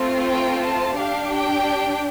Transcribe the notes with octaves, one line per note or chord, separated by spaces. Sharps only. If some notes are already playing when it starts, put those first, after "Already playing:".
Already playing: A3 C4 F4
G5
A5
D4 G4 F5
G5